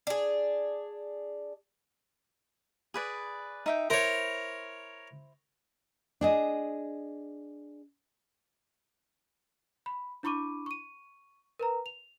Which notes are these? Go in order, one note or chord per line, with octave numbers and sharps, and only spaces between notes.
D4 G#4
G#4 B4 D5
D#4 E5 G5
E4 A#4 C5 C#5
D4 G#4 D#5
B5
D4 E4 B5 C#6 D6 D#7
C#6 D#7
A#4 B4 A#5
F7